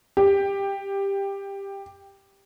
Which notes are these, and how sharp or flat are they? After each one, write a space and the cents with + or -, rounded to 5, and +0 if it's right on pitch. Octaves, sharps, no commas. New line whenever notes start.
G4 +10